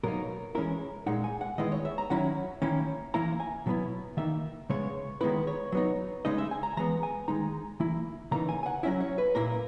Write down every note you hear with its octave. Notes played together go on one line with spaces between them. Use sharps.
B2 F#3 A#3 D#4 A#4
E3 G#3 C#4 E4 A#4
A#2 G#3 D#4 F#5
G#5
F#5
D#3 G#3 B3 E4 D#5
C#5
E5
A#5
D#3 F#3 C#4 E4 F#5
D#3 A#3 C#4 E4
E3 A#3 E4 A#5
G#5
B2 F#3 B3 E4
D#3 A#3 D#4 E5
C#3 G#3 B3 C#5
D#3 G#3 B3 E4 B4
C#5
F#3 B3 D#4
C#3 G#3 D#4 D#5
E5
G#5
A#5
E3 G#3 B3 A#5
G#5
D#3 G#3 D#4 A#5
E3 A#3 E4
C#3 E3 A#3 D#4 A#5
G#5
G#5
F#5
F#3 C#4 E4 E5
C#5
B4
A#2 A#3 E4 A#4